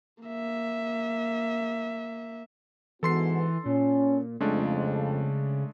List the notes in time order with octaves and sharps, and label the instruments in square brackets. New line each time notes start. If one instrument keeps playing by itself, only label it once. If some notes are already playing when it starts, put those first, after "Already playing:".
[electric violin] A#3 E5
[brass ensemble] G#2 B3 F#4 [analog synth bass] E3 [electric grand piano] A4 C6 C7
[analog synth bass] A#2 [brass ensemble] C#4
[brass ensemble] F2 [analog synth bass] C#3 [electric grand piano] G#3 A3 D4